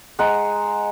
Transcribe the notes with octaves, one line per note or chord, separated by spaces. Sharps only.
G#3 F#5 A#5